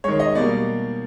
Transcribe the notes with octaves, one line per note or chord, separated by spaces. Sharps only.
D#3 G#3 C#5
D#5
B2 G3 A#3 D5